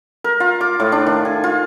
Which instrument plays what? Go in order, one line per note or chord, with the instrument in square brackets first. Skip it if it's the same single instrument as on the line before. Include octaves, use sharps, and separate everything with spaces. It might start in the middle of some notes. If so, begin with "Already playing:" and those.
[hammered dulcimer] A#4
F4
D6
A2
D4
D#3
G#5
F4